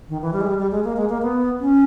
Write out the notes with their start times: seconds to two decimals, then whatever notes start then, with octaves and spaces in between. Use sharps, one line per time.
0.09 D#3
0.21 E3
0.33 G3
0.41 G#3
0.47 G3
0.58 G3
0.71 G#3
0.84 A#3
0.96 G#3
1.09 A#3
1.22 B3
1.60 C#4